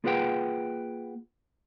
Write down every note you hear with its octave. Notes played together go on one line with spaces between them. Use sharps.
A#3 F4 G#4 B4 F#5 G5